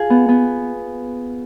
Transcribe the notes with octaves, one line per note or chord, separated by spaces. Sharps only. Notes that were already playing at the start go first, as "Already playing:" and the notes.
Already playing: F4 G#4
B3
B3